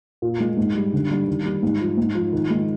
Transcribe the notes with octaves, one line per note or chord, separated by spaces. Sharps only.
A#2
G#3
G#2
G3
D3
G3
D#3
G3
G#2
F3
G#2
F3
D#3
G#3